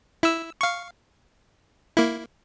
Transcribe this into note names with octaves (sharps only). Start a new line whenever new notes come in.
E4 E6
F5 C#6
A#3 E4